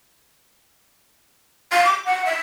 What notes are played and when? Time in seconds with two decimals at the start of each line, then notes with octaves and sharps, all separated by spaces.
1.73 F5
1.85 D6
2.05 F#5
2.26 E5